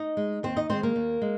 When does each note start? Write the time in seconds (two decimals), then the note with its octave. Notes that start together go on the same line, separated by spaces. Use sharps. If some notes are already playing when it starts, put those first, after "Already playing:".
Already playing: D#4 D#5
0.17 G#3
0.43 D#2 C4 C5
0.56 D#4 D#5
0.70 D#3 G#3 C4 C5
0.83 A#3 A#4
0.96 D#2
1.22 G#3